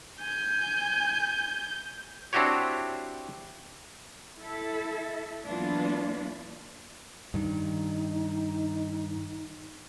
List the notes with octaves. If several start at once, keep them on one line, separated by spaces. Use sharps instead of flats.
G#5 G6
C4 D4 E4 F#4 G4 C#5
E4 A4 E5
E3 F#3 A#3 B3 D4 F4
G2 D#3 D#4